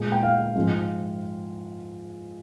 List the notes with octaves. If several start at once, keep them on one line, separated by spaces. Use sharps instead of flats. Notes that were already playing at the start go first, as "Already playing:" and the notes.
Already playing: A#2 G#3
G5
F5
G#2 F3 G#3